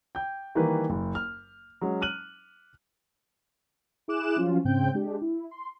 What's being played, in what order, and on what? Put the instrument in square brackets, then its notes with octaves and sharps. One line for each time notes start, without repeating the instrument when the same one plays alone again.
[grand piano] G5 G6
D#3 E3 G3 A#3 B4
F#1
F6
F#3 G#3 C#4
F6 F#6 D#7 F#7
[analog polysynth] E4 G#4 D6 F#6 E7
F3 F#3 C#4 F4
G#2 C#3 C4 G5 G6
G#3 D4 G4
E4
C6